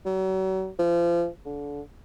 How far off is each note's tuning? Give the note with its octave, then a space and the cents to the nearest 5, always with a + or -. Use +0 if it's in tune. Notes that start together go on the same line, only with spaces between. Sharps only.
F#3 +40
F3 -30
D3 -30